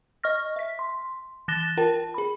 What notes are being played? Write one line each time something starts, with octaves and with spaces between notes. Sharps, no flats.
D#5 C#6 F6 A#6
E5 B6
C6
E3 F#6 A6 A#6 E7 G7
F4 A#4 G5 A5
G#4 B5